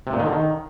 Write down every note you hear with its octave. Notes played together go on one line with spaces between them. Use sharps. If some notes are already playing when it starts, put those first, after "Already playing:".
C3
A#2
D#3
D3
D#3